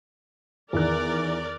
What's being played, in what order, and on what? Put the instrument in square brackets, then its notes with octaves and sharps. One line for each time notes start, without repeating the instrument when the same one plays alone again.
[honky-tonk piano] E2 D#3 F#6 [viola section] A#4 D5